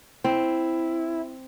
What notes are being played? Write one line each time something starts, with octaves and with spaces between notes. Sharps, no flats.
C4 E4